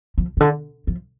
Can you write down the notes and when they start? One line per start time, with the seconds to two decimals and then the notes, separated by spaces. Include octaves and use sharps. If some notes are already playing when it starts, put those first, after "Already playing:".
0.18 F3
0.37 C3
0.40 D3
0.87 F3